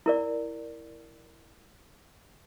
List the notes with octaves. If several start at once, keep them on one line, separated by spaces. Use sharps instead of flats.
E4 A#4 D5